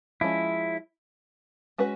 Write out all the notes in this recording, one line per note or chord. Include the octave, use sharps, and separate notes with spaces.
F3 G#3 C#4 E4
G#3 C#4 F#4 B4